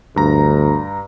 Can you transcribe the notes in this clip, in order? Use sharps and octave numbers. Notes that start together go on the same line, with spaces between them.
D2 G2 A#5